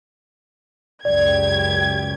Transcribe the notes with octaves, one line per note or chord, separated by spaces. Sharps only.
C#2 F#2 G4 D5 G#6